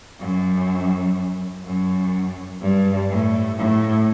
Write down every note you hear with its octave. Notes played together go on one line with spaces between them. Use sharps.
F#2
F#2
G2
A2
A2